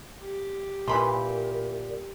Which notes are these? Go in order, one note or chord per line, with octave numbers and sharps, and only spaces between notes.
G4
A#2 E3 A#4 B5 C6